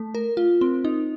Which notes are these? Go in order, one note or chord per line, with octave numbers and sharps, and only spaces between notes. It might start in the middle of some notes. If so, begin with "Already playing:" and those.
Already playing: A3
A#4
F4
C4
D#4